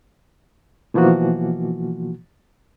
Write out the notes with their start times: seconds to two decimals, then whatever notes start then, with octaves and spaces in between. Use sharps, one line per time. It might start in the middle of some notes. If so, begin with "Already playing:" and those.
0.94 B2 E3 F3 A#3 F#4